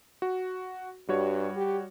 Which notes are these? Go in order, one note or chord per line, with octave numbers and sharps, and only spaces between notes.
F#4
G2 G3 F#4 C#5
G4